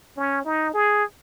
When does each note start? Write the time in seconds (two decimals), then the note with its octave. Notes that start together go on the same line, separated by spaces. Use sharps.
0.17 C#4
0.45 D#4
0.74 G#4